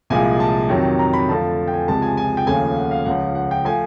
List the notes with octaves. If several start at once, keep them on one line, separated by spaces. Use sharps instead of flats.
C2 A#2 F3 G#3 G#5
A5
F2 C3 D#3 F#3
A#5
B5
F2 D3 F3 A3 A5
G5
G#5
C#2 C3 F3 G#3 A5
G#5
G#5
G5
D#2 C#3 F3 A3 G#5
F#5
F5
C#2 C#3 F3 F#5
F#5
G5
F3 A3 G#5